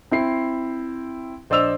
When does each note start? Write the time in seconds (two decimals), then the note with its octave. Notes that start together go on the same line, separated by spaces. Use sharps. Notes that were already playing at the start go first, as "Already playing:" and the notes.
0.11 C4 E4 C7
1.50 A#1 C5 D5 D#5 E6 F7